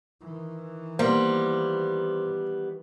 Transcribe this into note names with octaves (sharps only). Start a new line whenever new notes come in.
D#3 E3
G3 A#3 B3 C5 C6